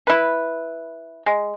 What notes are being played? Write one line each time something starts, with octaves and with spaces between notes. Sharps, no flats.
E4 B4
G#3